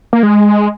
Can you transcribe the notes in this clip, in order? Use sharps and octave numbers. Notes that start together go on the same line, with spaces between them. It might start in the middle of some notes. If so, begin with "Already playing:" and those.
A#3
G#3